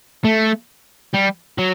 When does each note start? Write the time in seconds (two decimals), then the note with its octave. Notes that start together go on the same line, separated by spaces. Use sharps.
0.25 A3
1.14 G3
1.58 F#3